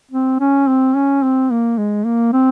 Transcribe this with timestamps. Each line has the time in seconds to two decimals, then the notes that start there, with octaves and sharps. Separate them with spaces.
0.11 C4
0.40 C#4
0.68 C4
0.95 C#4
1.23 C4
1.51 A#3
1.78 G#3
2.06 A#3
2.33 C4